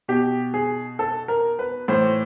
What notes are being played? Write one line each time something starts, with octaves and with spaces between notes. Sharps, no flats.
B2 G4
G#4
A4
A#4
B4
A2 E3 C5